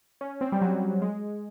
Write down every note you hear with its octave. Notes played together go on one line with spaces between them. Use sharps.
C#4
C4
G3
F#3
G#3